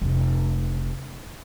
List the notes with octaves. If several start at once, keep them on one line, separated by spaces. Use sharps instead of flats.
F1 C#4